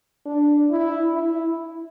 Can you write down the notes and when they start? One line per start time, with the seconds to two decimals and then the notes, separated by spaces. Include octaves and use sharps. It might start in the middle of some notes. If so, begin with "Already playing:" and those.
0.25 D4
0.71 E4
1.15 E4